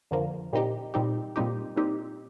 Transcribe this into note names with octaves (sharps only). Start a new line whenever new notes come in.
F2 D3 F3 A#3
A#2 G3 C4 D#4 G4
A#2 G3 C4 D#4 G4
A#2 G3 C4 D#4 G4
A#2 G3 C4 D#4 G4